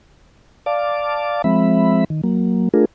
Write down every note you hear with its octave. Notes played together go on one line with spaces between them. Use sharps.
D5 F5 A5 D6
F3 G#3 C4 E5 B5
D#3
F#3 A#3
A3 D4 F4 G#4 A#4